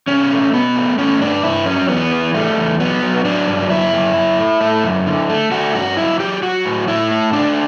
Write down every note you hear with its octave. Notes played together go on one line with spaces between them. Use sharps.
B2 C#4
A3
B2 B3
A3
A3 C#4
G2 D4
G2 E4
F#3 C#4
E2 B3
E3
G3 A3
E2
F#3 B3
F#3
F#3 D4
G2
F#2 E4
F#2
F#2
A3
A3
F#2
D3
A3
A3 F#4
G2 F#4
F#3 E4
F#3 G4
F#3 F#4
A2
A2 E4
A3
A3 D4